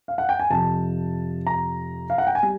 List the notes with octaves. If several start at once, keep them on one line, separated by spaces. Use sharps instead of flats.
F5
F#5
G5
G#5
F2 C3 F3 A5
A#5
F5
F#5
G5
G#5
G3